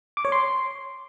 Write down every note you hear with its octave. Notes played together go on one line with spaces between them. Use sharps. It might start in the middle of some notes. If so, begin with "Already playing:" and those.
D6
C#5
C6